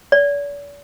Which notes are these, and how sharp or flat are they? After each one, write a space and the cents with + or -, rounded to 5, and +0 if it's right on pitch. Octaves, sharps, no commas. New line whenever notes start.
D5 -45